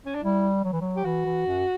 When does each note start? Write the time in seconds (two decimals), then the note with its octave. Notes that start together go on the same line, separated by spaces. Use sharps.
0.06 C#4
0.15 D4
0.23 G3 E4
0.64 F#3
0.72 E3
0.81 F#3
0.97 G4
1.05 E3 F#4
1.25 E3
1.46 F#2